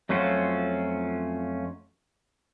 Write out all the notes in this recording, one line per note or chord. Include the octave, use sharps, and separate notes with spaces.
F2 F#3 A3 C#4 F4 F#4